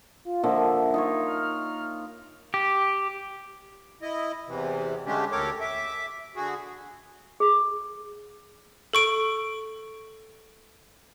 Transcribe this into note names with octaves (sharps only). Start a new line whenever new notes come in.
F4
D3 F3 A#3 E5
D#4 F4 C#5
F6
G4
E4 D#5
E2 C3 E3
D3 G#3 A3 C#4 D4 G4
D2 G4 A4 A#4 C#5 D6
E5 D6
D3 F#4 G#4
G#4
A4 C#6 D7